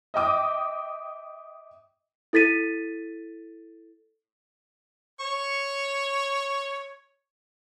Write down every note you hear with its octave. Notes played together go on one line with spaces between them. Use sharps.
D#5 E5 G5 D6 D#6
E4 A4 A6 B6 D#7
C#5 C#6